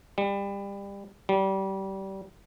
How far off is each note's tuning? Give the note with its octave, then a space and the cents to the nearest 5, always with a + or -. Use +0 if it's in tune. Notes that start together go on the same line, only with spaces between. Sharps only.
G3 +25
G3 -25